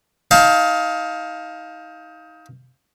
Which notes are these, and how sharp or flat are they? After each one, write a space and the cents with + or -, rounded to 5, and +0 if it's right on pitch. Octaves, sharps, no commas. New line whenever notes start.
D#4 +25 F5 +10 A5 +0